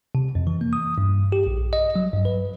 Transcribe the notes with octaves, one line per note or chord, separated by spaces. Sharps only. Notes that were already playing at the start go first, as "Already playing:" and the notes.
C3
F2
E3
A#3
D#6
G2
G4
A#1
D#5
F#3
G2
B4